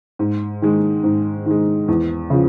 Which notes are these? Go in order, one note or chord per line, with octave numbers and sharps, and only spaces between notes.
G#2
D#3 G#3
G#2
D#3 G#3
E2
C#3 F3